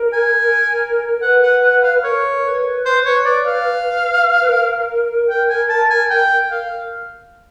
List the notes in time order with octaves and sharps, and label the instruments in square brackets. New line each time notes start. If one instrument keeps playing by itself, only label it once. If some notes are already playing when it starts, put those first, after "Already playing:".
Already playing: [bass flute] A#4
[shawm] G#5
[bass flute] A#4
[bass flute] B4 [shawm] F#5
[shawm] F#5
F#5
F5
[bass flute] A#4 [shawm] C#5
[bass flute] B4
[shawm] C5
C#5
D5
F5
[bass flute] B4
A#4
[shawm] G5
G#5
A5
G#5
G5
F5